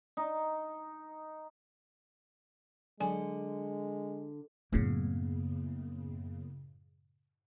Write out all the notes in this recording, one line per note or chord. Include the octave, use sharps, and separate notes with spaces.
D#4
D3 F#3 G#3 G#5
F#2 A2 C#3 A#3 B3